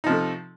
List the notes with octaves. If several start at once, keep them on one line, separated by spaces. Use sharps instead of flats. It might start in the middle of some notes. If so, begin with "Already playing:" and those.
C3 F3 A3 D#4